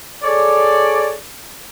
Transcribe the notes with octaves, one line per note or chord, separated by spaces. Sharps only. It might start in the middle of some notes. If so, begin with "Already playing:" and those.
G#4 A4 C#5 D5